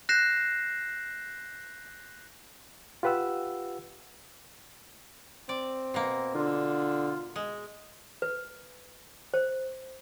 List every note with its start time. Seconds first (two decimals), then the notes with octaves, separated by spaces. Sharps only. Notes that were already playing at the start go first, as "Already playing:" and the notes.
0.09 F#6 G6 A#6 C7 E7
3.03 F4 G4 B4 F#5 E6
5.49 C4 D5
5.94 B2 A#3
6.35 D3 F4
7.36 G#3
8.22 B4
9.34 C5